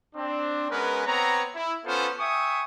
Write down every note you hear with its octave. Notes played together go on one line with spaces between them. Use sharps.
C4 D4
G#3 B3 C#4 A#4 B4
B3 C4 C#5 A#5
E4
B3 C#4 F4 A4 C5
E5 G5 G#5 C#6 D#6